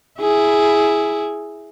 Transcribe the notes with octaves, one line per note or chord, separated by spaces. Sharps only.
E4 G#4